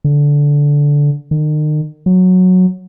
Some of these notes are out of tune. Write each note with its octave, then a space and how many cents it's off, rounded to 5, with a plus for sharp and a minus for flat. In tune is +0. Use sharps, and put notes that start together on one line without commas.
D3 -15
D#3 -40
F#3 -10